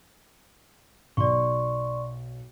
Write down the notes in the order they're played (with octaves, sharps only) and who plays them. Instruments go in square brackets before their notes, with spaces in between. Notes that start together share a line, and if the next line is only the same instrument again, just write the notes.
[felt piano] B1 [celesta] D5 C6 C#6